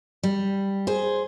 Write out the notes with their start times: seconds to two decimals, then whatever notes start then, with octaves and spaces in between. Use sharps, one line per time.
0.23 G3
0.87 G#4 C5